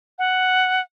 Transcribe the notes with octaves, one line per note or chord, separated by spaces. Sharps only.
F#5